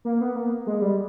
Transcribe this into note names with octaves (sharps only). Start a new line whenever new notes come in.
A#3
B3
A#3
G#3
G3